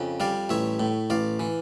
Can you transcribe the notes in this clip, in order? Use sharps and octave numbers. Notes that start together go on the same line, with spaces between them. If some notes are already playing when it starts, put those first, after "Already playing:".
Already playing: F2 C#3
G3 D5 F5
A1 C#5 E5
A2
A1 D5 F5
E3